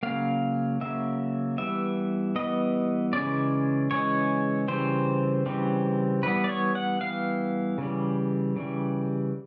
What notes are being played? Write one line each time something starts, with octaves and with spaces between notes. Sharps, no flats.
C#3 F#3 A#3 F5
C#3 F#3 A#3 E5
E3 G3 B3 E5
E3 G3 B3 D#5
C#3 E3 G#3 C#4 D5
C#3 E3 G#3 C#4 C#5
C#3 E3 G3 C4 C5
C#3 E3 G3 C4
E3 G3 B3 B4
D5
C#5
F#5
E3 G3 B3 F5
C#3 E3 G3
C#3 E3 G3